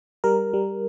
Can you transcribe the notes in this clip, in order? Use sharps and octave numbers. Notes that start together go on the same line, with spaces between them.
G3 A#4
G3